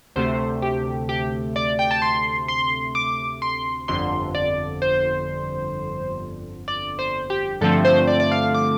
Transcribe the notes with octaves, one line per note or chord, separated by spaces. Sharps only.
D2 C3 A3 C5
G4
G4
D5
G5
A5
C6
C6
D6
C6
G1 F2 D3 C6
D5
C5
D5
C5
G4
G2 D3 F3 A3 C4 A4
C5
D5
D5
F5
D6